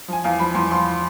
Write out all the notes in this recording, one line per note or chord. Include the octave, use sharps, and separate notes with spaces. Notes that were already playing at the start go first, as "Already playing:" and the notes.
F3 G#5
E2 F5
F3 B5
E2 C6
F3 C6